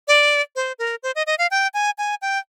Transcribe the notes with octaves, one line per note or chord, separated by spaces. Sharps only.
D5
C5
A#4
C5
D#5
D#5
F5
G5
G#5
G#5
G5